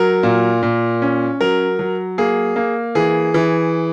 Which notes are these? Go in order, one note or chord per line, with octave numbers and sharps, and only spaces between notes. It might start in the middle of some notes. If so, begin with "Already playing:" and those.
Already playing: F#3 A#4
A#2
A#2
C#4
F#3 A#4
F#3
A#3 G#4
A#3
E3 G#4
E3